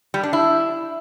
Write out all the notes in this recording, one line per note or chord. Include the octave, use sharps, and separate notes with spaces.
G3
D4
E4